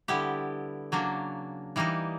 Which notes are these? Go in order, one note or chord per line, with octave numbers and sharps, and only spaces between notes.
D3 G3 B3 E4 G4
C#3 F#3 A#3 D4
E3 G3 A#3 D#4